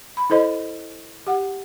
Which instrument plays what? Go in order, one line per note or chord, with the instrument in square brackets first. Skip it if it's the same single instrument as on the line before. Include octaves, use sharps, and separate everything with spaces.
[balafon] B5
E4 A4 C5 D#5
G4 F#5